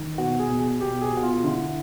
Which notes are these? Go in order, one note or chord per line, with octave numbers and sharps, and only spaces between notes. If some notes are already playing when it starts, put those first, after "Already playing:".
Already playing: D#3
B2 F#4
G#4
B2
G#4
B2 G4
G#4
B2 F#4
F4
D3 E4